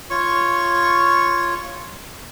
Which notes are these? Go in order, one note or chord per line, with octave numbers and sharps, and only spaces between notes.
F4 C#5 C#6